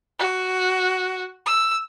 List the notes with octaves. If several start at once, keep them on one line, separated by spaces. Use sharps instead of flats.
F#4
E6